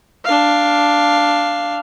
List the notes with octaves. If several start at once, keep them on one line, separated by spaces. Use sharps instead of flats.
D4 F5